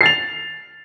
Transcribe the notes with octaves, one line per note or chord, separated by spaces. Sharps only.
A6 C7 F7